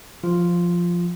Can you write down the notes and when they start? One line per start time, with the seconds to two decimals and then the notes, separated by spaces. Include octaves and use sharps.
0.23 F3 F4